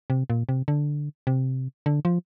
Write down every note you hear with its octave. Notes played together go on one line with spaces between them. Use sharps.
C3
A#2
C3
D3
C3
D3
F3